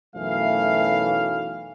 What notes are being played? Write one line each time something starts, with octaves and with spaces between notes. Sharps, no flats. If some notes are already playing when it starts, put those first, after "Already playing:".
B1 F#2 E3 A3 F5